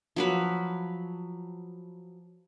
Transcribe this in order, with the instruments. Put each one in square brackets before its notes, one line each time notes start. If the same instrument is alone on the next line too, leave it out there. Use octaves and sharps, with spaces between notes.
[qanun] F3 F#3 B4